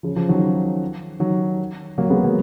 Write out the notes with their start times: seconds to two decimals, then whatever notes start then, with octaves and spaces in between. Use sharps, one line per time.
0.03 C#3 F3
0.16 C#3 F3
0.29 D#3 F#3
1.20 D#3 F#3
1.98 F#3 A#3
2.10 G#3 B3
2.24 F#3 A#3